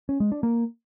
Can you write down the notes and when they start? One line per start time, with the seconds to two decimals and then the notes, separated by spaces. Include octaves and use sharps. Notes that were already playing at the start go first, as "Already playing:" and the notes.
0.09 C#4
0.20 G#3
0.32 D4
0.43 A#3